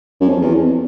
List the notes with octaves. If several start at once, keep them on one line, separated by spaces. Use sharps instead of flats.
F#2
F2
E2
F2